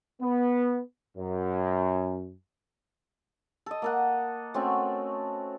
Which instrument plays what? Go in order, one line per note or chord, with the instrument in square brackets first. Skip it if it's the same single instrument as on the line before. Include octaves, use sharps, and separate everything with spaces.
[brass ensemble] B3
F#2
[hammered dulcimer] A4 D#5
A#3 A4 F#5
A3 C4 C#4 F#4